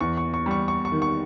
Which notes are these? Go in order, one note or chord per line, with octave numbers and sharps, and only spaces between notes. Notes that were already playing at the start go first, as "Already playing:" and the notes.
E2 C#6
C#6
C#6
G3 C#6
C#6
C#6
D#3
C#6